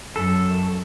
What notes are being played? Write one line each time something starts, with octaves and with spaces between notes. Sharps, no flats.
F#2 A4